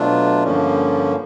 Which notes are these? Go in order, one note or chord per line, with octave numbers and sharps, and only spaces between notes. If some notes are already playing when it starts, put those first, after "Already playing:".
Already playing: B2 F#3 A3 D4 F4
G2 D3 F3 A#3 C#4